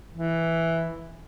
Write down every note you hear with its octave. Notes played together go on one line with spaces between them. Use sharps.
E3